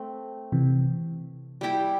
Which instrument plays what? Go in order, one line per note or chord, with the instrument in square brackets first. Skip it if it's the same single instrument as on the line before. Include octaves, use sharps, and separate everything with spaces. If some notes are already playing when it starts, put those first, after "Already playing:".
Already playing: [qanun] A3 C4
[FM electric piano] C3 E3
[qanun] G3 E4 G4